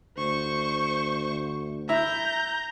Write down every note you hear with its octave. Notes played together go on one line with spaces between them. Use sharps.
D2 C5 C#6
E4 A#5 G6